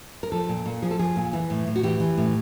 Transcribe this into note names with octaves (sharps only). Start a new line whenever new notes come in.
A#4
F3 A4
A#2
A#2
F3 G#4
A4
F3 G#4
A#2
E3
A2
A2
F#4
E3 G4
E3
A2